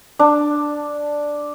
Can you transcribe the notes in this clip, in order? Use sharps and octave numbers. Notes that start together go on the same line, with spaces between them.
D4